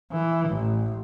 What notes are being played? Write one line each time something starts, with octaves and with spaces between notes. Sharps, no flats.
E3
A1